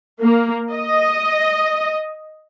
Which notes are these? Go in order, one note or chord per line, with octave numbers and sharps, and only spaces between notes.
A#3
D#5